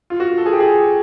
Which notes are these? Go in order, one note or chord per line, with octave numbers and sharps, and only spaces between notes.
F4
F#4
A4
G#4
G4
G#4